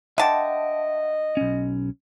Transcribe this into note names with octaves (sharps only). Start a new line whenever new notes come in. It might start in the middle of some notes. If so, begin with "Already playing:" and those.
D3 D#5 E5 F#5 G5 A5
B1 C#4